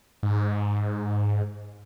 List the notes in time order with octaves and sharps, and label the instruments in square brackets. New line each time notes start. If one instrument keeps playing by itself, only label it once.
[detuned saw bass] G#2